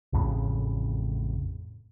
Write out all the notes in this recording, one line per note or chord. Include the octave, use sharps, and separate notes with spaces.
A1 F2 A2 C#3